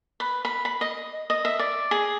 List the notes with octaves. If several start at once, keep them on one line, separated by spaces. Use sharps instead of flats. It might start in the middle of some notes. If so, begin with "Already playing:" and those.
B4
B5
B5
D#5
D#5
E5
D5
G#4